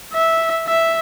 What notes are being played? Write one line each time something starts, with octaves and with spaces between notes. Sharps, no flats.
E5
E5